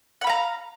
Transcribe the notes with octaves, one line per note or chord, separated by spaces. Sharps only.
F5 F#5 A#5 B5